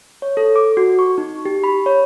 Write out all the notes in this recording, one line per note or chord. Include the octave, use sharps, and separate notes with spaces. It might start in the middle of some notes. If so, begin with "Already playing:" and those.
C#5
A4
D6
F#4
C#6
D#4
G4
B5
C#5